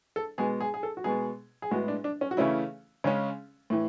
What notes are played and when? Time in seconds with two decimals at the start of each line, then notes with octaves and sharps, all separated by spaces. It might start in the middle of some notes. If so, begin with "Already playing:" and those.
0.16 A4
0.38 B2 G#3 B3 G#4
0.60 G#4
0.74 G#4
0.83 A4
0.97 F#4
1.04 B2 G#3 B3 G#4
1.62 G#4
1.71 A2 G#3 B3 F#4
1.88 D4
2.04 D4
2.21 C#4
2.31 F#4
2.37 C#3 E3 A3 C#4 E4
3.04 C#3 G#3 C#4
3.70 A2 E3